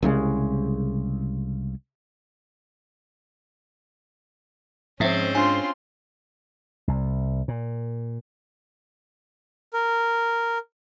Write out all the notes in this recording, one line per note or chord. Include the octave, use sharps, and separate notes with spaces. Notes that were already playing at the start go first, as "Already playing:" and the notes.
C2 C#3 G3 G#3
G#2 F3 C4 C#4 E5
D4 F4 G#5 C6
C2
A#2
A#4